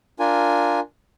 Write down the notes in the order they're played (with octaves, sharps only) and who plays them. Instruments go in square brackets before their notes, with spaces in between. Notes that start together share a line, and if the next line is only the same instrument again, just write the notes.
[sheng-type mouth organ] D4 F4 A#4 G#5